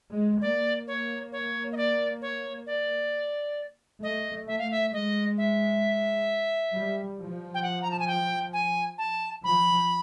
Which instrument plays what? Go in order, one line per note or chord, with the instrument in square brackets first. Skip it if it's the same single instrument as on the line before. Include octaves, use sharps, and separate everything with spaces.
[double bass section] G#3
[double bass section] A#3 [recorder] D5
[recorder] C#5
C#5
D#5
D5
C#5
D5
[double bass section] A3 [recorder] D#5
[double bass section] A3 [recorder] E5
[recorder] F5
E5
[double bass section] G#3 [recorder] D#5
[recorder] E5
[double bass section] G3
F3
[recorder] G5
F#5
A#5
A5
G#5
G5
G#5
A5
[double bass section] F3 [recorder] B5